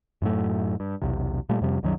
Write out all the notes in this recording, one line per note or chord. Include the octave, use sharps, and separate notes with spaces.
F#2 A2 F#3 A3
G2
B1 E2 C3
A#2 G3 A3
F2 C3 G3
C2 F#2 D#3 F#3